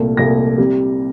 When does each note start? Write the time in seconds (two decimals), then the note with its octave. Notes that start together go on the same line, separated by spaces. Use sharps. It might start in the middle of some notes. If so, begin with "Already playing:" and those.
Already playing: C2 A#2 A3
0.17 C2 A#2 A3 A#6
0.58 C3 G3